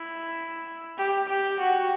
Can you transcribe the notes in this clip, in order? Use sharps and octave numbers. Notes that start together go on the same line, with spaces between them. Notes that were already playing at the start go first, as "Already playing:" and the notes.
Already playing: E4
G4
G4
F#4